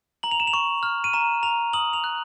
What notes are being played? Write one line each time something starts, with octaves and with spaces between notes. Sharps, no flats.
A#5 F#7
F7
E7
F7
C#6
F6
D#7
A#5 E7
A#5 F7
D#6 F#7
F7
F#6